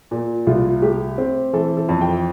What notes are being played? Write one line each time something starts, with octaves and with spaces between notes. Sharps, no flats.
A#2
C2 F4
A3 G4
C4
E3 A4
A4
F2
G5